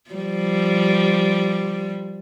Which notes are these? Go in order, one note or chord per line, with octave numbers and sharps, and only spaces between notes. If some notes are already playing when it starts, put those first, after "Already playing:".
F3 G3